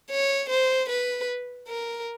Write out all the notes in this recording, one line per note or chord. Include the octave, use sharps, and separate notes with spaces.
C#5
C5
B4
A#4